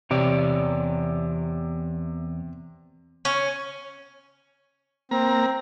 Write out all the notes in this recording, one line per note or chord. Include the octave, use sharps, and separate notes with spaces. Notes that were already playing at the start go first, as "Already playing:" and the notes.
E2 C3 C#5 D5
C#4
A#3 C4 A#5